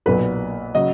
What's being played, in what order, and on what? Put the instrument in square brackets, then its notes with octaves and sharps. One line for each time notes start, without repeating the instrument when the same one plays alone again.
[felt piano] B1 A#2 F#3 B4
C#3 F#3 D#5